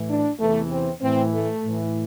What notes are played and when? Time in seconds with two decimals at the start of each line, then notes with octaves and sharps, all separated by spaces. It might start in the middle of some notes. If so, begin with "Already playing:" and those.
Already playing: A2 E3
0.08 D4
0.39 E2 C3 E3 A3
0.70 C4
1.01 A2 E3 C4
1.32 A3
1.63 A2 E3